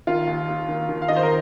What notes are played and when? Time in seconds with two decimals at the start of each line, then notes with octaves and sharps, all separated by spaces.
0.07 D#3 F4
0.27 D#2
0.49 D#2
0.69 D#3
0.89 D#3
1.02 F5
1.08 D#3 D#5
1.16 C5
1.23 A#4